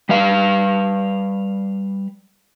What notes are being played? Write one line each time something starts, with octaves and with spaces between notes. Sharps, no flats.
G3 B4 F5